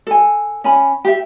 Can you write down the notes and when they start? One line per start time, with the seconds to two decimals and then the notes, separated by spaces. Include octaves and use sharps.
0.07 A4 G#5
0.64 C#4 G#5 B5
1.05 G4 E5